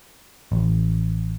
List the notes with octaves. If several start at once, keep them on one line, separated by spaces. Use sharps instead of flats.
A1